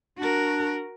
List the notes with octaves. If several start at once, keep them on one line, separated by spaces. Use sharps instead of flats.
D4 F#4 A#4